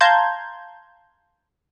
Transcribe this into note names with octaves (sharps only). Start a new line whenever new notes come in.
F5 A5 A#5 C6 G6 G#6